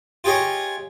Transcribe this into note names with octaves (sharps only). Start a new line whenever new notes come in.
F4 G4 G#4 C#5 D#5